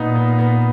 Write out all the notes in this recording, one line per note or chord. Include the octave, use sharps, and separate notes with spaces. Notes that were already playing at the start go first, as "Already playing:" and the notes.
Already playing: A#2 B3 D#4
B3
B3